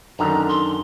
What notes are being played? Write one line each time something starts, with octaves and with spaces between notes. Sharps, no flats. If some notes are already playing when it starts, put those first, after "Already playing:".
F#2 D3 D#3 A#5
C6